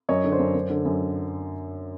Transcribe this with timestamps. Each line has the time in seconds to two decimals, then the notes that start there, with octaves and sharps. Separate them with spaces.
0.09 F#2 C#5 D#5
0.24 D3
0.32 C5 D5
0.39 F#2
0.55 F#2
0.70 D3
0.85 F#2